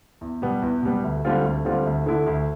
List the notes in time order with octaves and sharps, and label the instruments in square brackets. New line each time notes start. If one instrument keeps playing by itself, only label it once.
[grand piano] E2
B2 G3 B3
E2
B2 G3 B3
D2
D3 G3 C4 F4
D2
D3 G3 C4 F4
D2
D3 A3 E4
D2